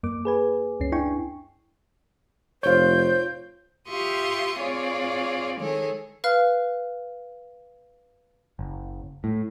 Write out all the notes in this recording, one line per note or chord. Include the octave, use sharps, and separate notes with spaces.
F#2 A#3 D6
G#4 B4 G#5
C#2 F#2 C#4 C7
D4 E4 G5 G#5 C#6
F1 F4 C5 C#5 G6
F4 G4 E5 C6 C#6 D#6
C4 F4 G#4 C#5 D5
D#3 G#3 G#4 A4 C#5
B4 F5 F6
F#1
A2